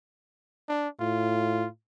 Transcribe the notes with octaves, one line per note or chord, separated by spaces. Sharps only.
D4
A2 F4